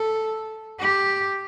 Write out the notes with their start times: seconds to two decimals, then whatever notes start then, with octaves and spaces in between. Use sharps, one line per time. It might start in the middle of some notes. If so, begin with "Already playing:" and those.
Already playing: A4
0.79 G4